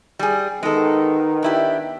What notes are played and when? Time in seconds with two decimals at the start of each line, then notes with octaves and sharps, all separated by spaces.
0.19 G3 G#4
0.63 D#3 G#3 B3 D#4 A4
1.43 D4 E4 G4